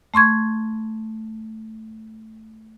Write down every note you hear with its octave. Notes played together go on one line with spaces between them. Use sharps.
A3 C6 C#6 G#6